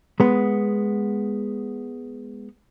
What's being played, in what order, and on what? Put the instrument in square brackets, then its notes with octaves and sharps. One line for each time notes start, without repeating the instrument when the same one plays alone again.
[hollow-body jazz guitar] G#3 B3